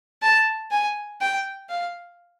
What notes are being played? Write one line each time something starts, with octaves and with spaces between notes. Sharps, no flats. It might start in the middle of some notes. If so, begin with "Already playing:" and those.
A5
G#5
G5
F5